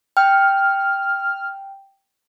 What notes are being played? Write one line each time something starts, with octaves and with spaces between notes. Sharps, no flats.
G5 F6